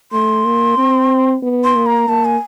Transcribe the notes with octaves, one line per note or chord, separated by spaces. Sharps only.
A3 C6
A#3
C4
B3
C6
A#3
A#5
A#3 A5
G#5